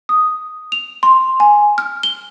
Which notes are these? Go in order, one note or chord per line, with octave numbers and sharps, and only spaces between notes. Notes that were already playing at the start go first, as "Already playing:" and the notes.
D#6
F7
C6
G#5
F6
G7